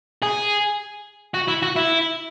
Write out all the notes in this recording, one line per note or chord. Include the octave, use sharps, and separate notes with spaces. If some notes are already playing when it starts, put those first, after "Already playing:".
G#4
F#4
E4
F#4
E4